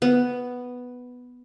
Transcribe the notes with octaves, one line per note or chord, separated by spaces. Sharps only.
B3